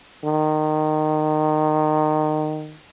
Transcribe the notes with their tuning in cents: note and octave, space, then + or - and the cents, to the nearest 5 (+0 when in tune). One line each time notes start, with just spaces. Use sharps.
D#3 -20